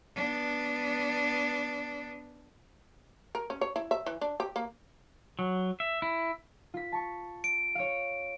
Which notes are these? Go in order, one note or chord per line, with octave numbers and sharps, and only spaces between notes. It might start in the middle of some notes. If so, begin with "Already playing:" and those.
B3 D4
A#4
C#4
C#5
E4
E5
E3
D4
G4
A#3
F#3
E5
E4
F4 B6
A5 C#6
D7
C#5 F5